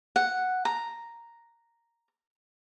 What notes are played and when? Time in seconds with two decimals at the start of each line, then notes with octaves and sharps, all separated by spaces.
0.16 F#5
0.65 A#5